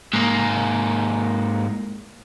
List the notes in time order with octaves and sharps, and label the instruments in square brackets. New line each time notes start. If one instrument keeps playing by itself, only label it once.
[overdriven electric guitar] G#2 A#3